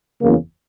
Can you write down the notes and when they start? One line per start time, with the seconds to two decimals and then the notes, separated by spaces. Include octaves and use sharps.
0.21 F#1 E2 C#3 F#3 A#3